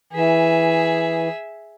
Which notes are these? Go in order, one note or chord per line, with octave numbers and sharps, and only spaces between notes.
E3 G#4 E5